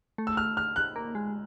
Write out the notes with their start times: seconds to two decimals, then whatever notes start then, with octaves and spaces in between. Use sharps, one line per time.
0.18 A3
0.27 E6
0.37 F6
0.57 F6
0.76 F#6
0.96 A#3
1.15 G#3